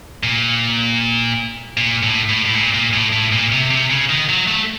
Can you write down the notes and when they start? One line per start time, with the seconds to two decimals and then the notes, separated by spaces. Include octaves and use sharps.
0.23 A#2
1.77 A#2
2.03 A2
2.29 A2
2.45 A2
2.55 A#2
2.74 A#2
2.93 A2
3.12 A2
3.32 A#2
3.52 C3
3.71 C3
3.90 C#3
4.10 D#3
4.29 F#3
4.48 A3